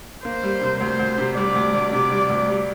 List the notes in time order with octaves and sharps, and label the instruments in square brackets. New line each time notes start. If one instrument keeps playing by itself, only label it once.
[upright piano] A#3 [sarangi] C5
[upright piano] G3
C3
[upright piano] D2 [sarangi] C5
[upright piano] D2
C3
[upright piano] G3 [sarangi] D5
[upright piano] D2
D2
[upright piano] C3 [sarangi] D5
[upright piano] G3
D2
G3